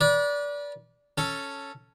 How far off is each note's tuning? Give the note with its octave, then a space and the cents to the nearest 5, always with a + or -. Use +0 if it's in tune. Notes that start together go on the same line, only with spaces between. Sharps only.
B4 -40 D5 -15
C#4 +0 A4 +0